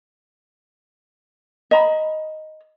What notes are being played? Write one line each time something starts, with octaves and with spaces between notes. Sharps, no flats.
D#5 A#5 B5